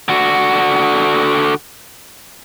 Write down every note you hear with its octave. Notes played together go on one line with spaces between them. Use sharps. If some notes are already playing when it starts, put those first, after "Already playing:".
D3 F#4